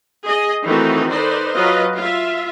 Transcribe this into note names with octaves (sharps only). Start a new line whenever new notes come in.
G#4 D#5
D#3 E3 A3 C4 D#4 F#4
D#4 A4 B4 C5 D5
F#3 F4 B4 D#5
F4 E5